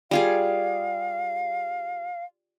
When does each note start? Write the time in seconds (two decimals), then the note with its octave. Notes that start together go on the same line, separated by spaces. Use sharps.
0.11 G3 F4 G#4 F5